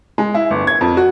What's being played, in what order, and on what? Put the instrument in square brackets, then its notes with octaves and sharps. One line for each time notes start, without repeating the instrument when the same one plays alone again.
[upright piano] G#3
E4
G1
G#6
F2
F#4